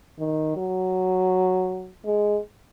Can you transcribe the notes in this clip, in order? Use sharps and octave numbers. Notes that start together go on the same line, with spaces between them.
D#3
F#3
G#3